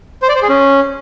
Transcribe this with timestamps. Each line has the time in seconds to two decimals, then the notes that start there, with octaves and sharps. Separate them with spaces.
0.22 C5
0.29 D5
0.36 C5
0.42 G#4
0.49 C#4